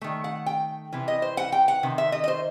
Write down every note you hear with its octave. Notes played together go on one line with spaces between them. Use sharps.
D#3 A3
F#5
G5
C3 E3
D#5
C5
F#5
G5
F#5
C3 D#3
E5
D#5
D#5
C5